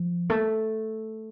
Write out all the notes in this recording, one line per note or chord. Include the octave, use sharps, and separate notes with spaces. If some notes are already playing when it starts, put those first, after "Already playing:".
Already playing: F3
A3